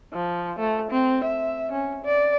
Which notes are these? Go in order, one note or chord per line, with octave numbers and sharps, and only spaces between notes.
F3
A3
C4
E5
C#4
D5